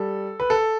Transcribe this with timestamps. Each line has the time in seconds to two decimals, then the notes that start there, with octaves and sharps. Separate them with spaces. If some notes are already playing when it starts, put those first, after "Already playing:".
Already playing: G3 A4
0.40 B4
0.50 A4